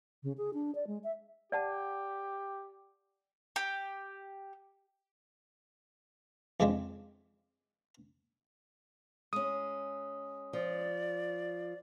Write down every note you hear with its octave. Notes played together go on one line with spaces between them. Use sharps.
C#3
G#4
D4
D5
G#3
E5
G4 D5 F#5 A5
G4
F2 C#3 F3 G#3 C4 D4
G#3 C#4 D#6
F3 D5